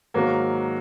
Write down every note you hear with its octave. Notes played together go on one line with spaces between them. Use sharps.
G#2 D#3 F#3 A#3